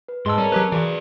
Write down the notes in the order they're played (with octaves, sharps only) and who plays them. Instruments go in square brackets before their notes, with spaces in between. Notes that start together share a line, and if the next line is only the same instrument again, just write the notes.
[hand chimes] B4
[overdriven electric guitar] G#2 [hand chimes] G#4 D#5 A5 [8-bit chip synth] C6 E6
[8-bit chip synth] G3 [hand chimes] C4 A#4 A#5 [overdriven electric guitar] C#4
[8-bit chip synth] F#3 G4 B4
[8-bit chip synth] E3 [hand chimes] F#4 G#4 [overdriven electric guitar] B4 D5